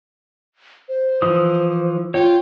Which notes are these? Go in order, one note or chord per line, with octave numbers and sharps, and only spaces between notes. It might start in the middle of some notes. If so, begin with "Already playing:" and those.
C5
E3 F3 D#6
F4 C#5 G5